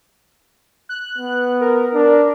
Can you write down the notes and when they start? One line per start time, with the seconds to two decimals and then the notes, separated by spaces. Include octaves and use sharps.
0.89 F#6
1.18 B3
1.61 A#4
1.94 D4